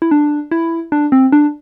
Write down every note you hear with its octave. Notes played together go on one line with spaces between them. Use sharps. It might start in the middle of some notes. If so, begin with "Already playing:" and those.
E4
D4
E4
D4
C4
D4